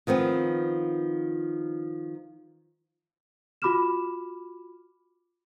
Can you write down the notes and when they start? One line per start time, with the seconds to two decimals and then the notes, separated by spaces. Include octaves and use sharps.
0.07 D#3 F3 B3 C4
3.62 F4 F#4 B5 D6 F6 E7